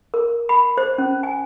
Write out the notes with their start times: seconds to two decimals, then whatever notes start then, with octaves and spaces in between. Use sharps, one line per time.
0.14 A#4
0.49 B5
0.77 C5
0.98 C#4
1.23 G#5